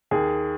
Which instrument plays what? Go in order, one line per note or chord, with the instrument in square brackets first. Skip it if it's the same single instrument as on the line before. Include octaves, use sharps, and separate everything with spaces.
[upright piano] D#2 G#4